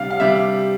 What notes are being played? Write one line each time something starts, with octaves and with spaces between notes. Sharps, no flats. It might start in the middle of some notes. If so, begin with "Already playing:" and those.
Already playing: C3 G3 D4 F5
F5
C3 G3 D4 E5